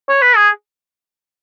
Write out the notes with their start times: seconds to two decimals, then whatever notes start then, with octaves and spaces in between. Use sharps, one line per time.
0.09 C#5
0.22 B4
0.36 G#4